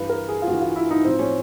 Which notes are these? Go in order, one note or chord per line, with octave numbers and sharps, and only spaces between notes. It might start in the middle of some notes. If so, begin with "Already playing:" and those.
Already playing: G2 E3 B4
A#4
G#4
F4
G2 E3 F#4
F4
E4
D#4
A2 F3 C4
C#4